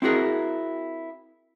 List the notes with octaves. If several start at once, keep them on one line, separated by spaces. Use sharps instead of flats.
C4 E4 F#4 G#4 A#4